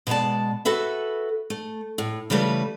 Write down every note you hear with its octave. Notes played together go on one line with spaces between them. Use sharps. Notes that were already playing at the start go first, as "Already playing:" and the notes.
B2 G#3 B3 D5 A5
F#4 A4 B4 E5
A3
A2
C#3 E3 G3 A3 B4